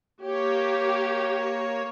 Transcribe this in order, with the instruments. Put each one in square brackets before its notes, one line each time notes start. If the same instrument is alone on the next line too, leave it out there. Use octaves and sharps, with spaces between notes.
[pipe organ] A#3 C#5 [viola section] G4